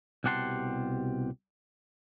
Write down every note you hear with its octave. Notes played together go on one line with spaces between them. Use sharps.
C2 B2 G4 F#5 A5 C6